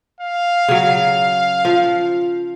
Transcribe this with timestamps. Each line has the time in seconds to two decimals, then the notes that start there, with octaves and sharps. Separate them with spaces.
0.21 F5
0.68 C#3 F#3
1.65 F3